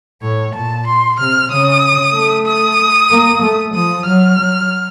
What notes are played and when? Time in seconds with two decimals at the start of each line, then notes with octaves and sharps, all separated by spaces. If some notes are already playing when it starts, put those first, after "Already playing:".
0.22 A2 C#5
0.54 A#2 A5
0.87 C6
1.18 C3 F6
1.51 C#3 D#6
2.14 A3
2.46 D#6
3.10 A#3
3.42 A3
3.75 F3 D#6
4.06 F#3 F6
4.38 F#3